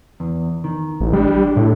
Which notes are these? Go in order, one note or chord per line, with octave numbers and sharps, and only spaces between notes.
E2
D#3
A1
G3 G#3 D4
A2